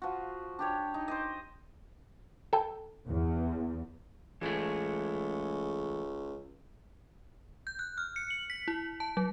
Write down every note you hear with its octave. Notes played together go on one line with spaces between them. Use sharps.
F3 F#4
D4 G4 C#5
D#4
C5 D5 D#5
A4 G5
E2
C#2 E3 G#3 A3
G6
F#6
F6
C#7
F#7
B6
E4
A5
F#3